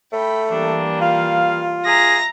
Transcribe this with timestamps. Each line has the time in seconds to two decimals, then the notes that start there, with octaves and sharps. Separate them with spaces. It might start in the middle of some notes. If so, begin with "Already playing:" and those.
0.12 A3 G5 B5
0.51 E3 G3 A#3 D4
1.01 F4 F5
1.86 G#4 E5 A#5 A#6